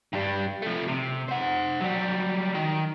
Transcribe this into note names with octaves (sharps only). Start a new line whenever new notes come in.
G2 G3
F3 A3
C3
C5 F#5
F#3 G3
D#3